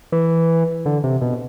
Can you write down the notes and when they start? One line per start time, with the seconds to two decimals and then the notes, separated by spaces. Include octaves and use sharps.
0.12 E3
0.86 D3
1.04 C3
1.21 B2